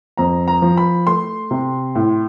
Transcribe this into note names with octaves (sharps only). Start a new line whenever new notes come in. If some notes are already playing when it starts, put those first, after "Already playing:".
F2 A#5
A#5
F3
B5
A3 C6
C3
A2